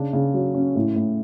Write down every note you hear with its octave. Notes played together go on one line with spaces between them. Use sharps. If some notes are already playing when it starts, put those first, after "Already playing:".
Already playing: C#3 D4
C#3
F#3
C#4
A2
A2